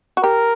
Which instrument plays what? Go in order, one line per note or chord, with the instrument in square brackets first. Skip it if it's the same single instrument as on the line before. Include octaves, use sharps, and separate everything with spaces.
[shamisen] F#4
[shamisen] G4 [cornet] A#4